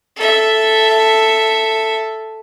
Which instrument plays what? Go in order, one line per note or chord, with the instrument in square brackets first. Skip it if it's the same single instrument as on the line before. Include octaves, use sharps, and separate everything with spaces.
[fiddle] A4 E5